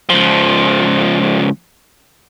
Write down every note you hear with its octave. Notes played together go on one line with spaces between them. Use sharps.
C#2 F3